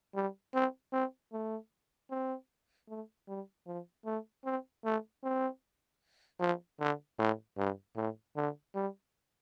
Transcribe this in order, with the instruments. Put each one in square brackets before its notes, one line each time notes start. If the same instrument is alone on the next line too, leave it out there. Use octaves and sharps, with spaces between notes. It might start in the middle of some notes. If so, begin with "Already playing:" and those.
[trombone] G3
C4
C4
A3
C4
A3
G3
F3
A3
C4
A3
C4
F3
D3
A2
G2
A2
D3
G3